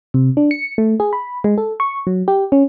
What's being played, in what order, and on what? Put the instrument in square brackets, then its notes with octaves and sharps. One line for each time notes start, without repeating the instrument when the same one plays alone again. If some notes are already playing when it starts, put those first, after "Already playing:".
[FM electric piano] C3
D4
C#7
A3
G#4
B5
G#3
A4
C#6
F#3
G4
C#4